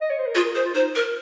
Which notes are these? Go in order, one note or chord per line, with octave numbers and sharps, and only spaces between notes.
D#5
C#5
C5
A#4
F4 G#4
A#4
G#4 C5
F4
D#4 C5
A#4